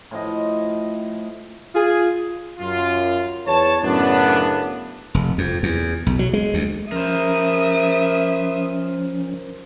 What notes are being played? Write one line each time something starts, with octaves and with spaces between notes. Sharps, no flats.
A2 F3 D#5
F4 G#4
F#2 F4
E2 C#5 A5
F#2 A2 C#3 B3 D4
F1
F2
E2
B1
F#3
G#3
D2
F3 C#4 A#4 C5 E5 D#6